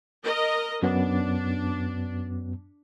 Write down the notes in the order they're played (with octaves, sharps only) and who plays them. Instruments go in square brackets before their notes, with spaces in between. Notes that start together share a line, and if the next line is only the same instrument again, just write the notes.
[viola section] A#4 D#5
[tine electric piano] F#2 F#3 B3 [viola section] D4